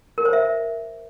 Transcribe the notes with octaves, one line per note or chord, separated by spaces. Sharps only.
A#4
C5
E5